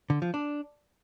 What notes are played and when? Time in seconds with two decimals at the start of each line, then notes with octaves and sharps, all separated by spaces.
0.10 D3
0.22 F3
0.34 D4